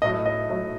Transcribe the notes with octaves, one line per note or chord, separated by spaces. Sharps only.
A2 F#3 A3 D#5
D#5
A2 F#3 A3